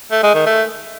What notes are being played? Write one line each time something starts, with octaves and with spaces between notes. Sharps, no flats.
A3
G#3
D#3
A3